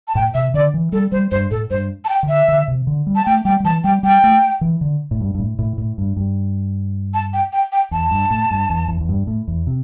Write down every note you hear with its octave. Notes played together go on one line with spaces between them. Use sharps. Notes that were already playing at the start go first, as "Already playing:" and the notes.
A5
A2 G5
C3 E5
D3 D5
E3
G3 A4
G3 C5
G2 C5
A2 A4
G2 C5
A5
G5
D3
E5
D3
C3
D3
G3
A5
A3 G5
G3 G5
G3
E3 A5
G3 G5
G3 G5
A3
E3
D3
A2
G2
G2
A2
A2
A2
G2
G2
A5
G5
G5
G5
E2 A5
G2
A2
G2
E2
E2
E2
G2
A2
E2
C3